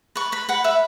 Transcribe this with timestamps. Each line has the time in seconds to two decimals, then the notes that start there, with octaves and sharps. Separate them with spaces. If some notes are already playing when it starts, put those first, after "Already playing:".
0.16 B4 C#6
0.32 B4 B5
0.49 B4 F#5
0.64 B4 E5